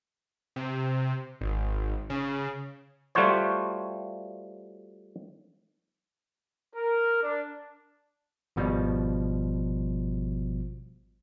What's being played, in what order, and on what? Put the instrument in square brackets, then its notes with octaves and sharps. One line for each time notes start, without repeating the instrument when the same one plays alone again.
[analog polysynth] C3
G#1
C#3
[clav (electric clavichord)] G3 A3 F4 F#4 C5 C#5
[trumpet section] A#4
D4
[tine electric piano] G#1 B2 F3 G3